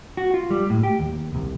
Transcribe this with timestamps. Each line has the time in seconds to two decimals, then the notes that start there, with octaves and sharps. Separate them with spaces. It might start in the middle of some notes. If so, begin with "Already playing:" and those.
0.17 F#4
0.34 F4
0.50 G3
0.70 A2
0.83 G4
0.99 D#2
1.35 C2